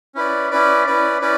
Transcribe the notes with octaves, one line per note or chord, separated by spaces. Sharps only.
C#4 E4 B4 D5
C#4 E4 B4 D5
C#4 E4 B4 D5
C#4 E4 B4 D5